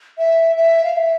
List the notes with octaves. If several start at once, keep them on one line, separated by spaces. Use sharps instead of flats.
E5
E5
F5
E5